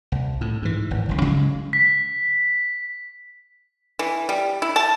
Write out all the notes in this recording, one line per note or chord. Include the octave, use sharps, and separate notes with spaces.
C2
A2
G#2 E3
G#1
F#1 C#2
C#3 F#3 G#3
B6
E3
G3
E4
A5